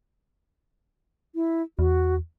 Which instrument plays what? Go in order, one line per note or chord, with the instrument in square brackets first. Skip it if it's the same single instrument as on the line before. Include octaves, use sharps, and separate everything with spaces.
[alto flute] E4
[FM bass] E2 [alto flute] F#4